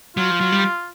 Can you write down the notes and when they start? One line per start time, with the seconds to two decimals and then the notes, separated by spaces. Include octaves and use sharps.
0.17 F#3 F4
0.30 F3
0.41 F#3
0.52 G3